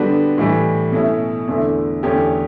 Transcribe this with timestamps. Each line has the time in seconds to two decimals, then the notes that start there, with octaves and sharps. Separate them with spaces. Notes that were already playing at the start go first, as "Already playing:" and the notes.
Already playing: D3 G3 B3 D4 F#4
0.38 A2 E3 G3
0.92 B2 A3 C#4 E4
1.47 E2 D3 A3 E4
2.03 E2 D3 A3 C#4 G4